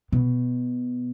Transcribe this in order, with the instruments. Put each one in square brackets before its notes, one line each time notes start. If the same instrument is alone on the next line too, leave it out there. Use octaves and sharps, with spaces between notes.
[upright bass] B2